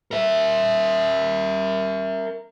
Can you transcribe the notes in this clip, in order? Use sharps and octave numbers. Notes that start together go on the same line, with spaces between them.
A#4 E5